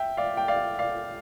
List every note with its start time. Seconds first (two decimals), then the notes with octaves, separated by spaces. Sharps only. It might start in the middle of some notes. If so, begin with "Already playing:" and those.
Already playing: E5 G5
0.17 D5 F5
0.37 G5
0.48 D5 F5
0.79 D5 F5